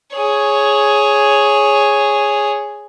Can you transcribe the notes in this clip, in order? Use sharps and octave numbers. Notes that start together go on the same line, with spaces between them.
G#4 C#5